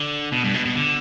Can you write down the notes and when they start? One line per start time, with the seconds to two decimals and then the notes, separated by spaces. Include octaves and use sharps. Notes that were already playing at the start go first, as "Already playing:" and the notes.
Already playing: D3
0.32 B2
0.44 G2
0.54 B2
0.65 B2
0.75 D3